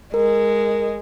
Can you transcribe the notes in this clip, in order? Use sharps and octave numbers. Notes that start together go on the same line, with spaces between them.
G#3 A#4